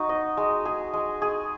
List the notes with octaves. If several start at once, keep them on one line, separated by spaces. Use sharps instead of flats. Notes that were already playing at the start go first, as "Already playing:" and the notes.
Already playing: D#4 F#4
D#5
G#3
G#4
G#3
G#4